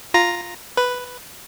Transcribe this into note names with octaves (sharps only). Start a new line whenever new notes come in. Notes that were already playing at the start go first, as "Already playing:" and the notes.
F4 A#5 A#6
B4